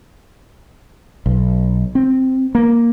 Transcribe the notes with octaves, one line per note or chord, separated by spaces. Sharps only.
B1
C4
A#3